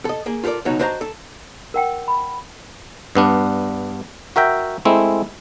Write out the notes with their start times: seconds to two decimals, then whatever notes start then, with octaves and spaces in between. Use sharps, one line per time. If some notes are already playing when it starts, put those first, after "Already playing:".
0.05 A4 D#5
0.26 A#3 G#4
0.44 F4 G4 A4 A#4 D5
0.65 C#2 B2 F#3 D#4 F#4 C#5
0.79 D4 F#4 C5 D#5 F#5 A#5
1.01 A4
1.74 A#4 F#5 G5
2.08 B5
3.15 G2 B3 D4
4.36 F#4 A#4 E5 G5
4.85 G#3 A3 C4 E4